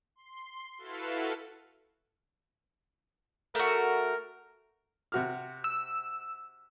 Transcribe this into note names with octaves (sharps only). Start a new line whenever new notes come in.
C6
E4 F#4 A4 B4 F5
A3 F#4 A#4
C3 F#4 F6
E6